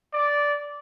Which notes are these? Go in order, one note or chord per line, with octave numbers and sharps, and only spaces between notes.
D5